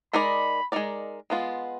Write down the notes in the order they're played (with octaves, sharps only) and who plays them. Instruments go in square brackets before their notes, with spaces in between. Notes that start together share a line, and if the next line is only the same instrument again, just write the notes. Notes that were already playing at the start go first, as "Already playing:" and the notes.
[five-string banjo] G#3 D#4 A#4 D5 [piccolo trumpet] B5
[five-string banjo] G#3 D#4 A#4 D5
G#3 B3 F4